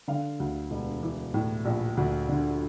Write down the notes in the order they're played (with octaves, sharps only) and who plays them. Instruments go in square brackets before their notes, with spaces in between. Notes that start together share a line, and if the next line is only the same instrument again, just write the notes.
[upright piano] D3 F5
D2
E1
E3
A2
A#1
D2
D3